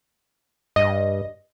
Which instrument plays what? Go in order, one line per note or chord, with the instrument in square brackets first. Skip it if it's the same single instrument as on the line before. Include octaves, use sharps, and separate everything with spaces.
[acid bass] G2 [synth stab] D#5